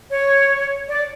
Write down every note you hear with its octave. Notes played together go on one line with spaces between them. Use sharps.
C#5
D5